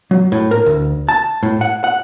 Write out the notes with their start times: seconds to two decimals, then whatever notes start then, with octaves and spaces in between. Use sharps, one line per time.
0.11 F#3
0.32 A2
0.51 A#4
0.66 D2
1.09 A5
1.43 A2
1.61 F#5
1.84 F#5